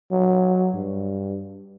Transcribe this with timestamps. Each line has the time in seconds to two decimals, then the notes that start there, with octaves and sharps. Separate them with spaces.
0.11 F#3
0.74 G2